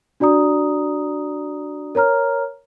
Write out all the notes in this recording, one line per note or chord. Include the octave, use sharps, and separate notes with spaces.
D4 F#4 D5 A#5 D#6
A#4 C#5 A#5 F6